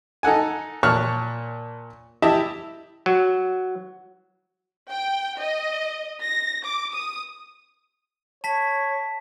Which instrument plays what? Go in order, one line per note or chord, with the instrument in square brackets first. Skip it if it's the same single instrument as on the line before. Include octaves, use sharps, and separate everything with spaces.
[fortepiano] D#4 A4 F#5 G#5
A#2 C#5 A5 C#6 F6 F#6
E4 G4 D#5 E5 A5
[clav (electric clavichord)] F#3
[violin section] G5
D#5
A#6
D6
D#6
[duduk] C#5 [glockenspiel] A5 B6